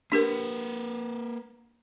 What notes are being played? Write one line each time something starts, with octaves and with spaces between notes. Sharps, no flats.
A#3 D4 G4 A#4 B4